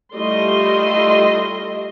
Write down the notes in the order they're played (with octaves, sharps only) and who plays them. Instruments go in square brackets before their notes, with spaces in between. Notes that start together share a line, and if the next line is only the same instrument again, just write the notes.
[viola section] G3 A3 E4 F4 D#5 C6